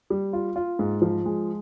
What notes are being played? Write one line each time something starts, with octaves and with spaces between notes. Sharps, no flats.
G3
F4
F4
G#2
F3
G#3